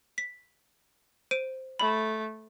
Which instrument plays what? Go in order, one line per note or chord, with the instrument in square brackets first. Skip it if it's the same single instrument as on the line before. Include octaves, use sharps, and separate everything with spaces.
[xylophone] B6
C5 D7 D#7
[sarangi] A3 [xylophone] B5